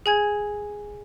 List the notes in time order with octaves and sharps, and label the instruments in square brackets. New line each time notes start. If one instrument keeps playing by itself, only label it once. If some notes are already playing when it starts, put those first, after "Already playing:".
[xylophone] G#4 G#5 G#6